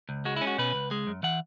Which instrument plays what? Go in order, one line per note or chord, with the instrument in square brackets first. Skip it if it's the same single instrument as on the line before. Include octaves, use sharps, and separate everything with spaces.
[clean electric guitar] C#2
G#3 F#4
E4
C#4
F#4
B2 B4
C#2
G#3
F#2
E3 F#5